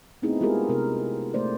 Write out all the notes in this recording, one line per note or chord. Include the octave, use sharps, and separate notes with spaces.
A3 B3 C4 D#4 E4 G#4
G#3 B3 F4 G4 G#4 A#4
C3 B3 A#4
A3 A#3 C5 D5